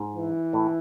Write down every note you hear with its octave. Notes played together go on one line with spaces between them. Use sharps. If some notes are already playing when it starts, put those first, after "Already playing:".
Already playing: G#2
E3
A2